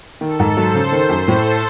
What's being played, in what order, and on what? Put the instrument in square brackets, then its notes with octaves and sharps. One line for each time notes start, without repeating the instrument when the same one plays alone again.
[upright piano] D#3 [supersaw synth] A4
[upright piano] G#2
[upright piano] F#3 [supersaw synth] C5
[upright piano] C#3
D#3
F#2
[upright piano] A2 [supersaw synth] A4